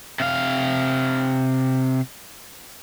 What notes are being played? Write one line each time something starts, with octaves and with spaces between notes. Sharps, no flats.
C3 F5